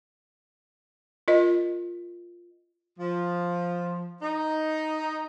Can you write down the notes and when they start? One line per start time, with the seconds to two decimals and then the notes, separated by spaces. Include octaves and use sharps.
1.28 F4 A#4 D#5
2.98 F3
4.22 D#4